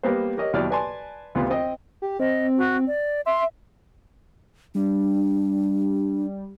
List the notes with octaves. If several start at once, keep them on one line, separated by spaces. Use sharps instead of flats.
G3 A#3 B3 B4 C5
G4 A#4 C#5 D#5
D#2 B2 F#3 E4 D5 F6
B4 D5 G#5 A5 C6
D2 C3 B3 F4
C4 D#5 G5
G4
C4 D#5
F#4
D5
E5 C6
G3 D4